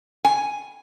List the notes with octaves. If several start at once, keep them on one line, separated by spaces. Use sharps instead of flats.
G#5